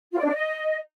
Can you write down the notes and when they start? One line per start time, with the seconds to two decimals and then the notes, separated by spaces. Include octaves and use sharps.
0.13 F4
0.18 D5
0.23 D4
0.28 D5
0.33 D#5